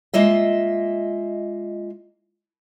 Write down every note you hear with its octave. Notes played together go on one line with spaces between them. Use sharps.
G#3 A#3 F4 D#5 E5